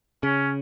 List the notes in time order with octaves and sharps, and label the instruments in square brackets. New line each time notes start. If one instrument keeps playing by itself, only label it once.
[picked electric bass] C#3 [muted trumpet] C#4